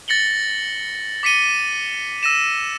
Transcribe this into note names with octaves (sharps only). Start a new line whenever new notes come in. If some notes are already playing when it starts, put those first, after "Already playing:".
A6 A#6 C#7 F#7 G7
D6 B6 C#7 D#7 G7
E6 A#6 D#7 E7